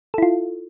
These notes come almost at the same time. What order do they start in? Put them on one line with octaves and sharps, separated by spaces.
A4 E4 F4